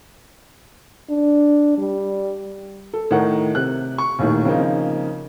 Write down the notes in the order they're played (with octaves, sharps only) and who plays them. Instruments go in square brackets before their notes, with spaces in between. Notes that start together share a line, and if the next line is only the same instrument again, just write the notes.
[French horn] D4
G3
[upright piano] A4
A2 D#3 D#4 A#4 F#5
C3 F#6
C#6
A#1 D#2 A2 D#3
C#3 F3 A#3 C4 D#4